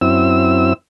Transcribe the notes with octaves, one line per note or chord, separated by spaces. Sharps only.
F#2 C4 E4 E6